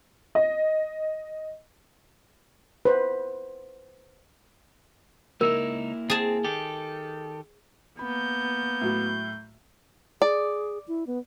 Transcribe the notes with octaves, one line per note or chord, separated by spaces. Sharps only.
D#5
B4 C5
C#2 A#3 D#4 E4 A#4
C4 G#4 A5
D#3 G4 A4
A#3 B3 B5 G6
A2 F#3
G#4 D5
E4
B3